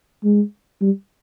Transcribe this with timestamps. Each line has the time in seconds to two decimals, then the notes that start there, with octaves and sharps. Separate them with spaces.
0.24 G#3
0.82 G3